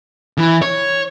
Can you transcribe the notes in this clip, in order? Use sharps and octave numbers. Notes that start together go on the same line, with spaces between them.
E3
C#5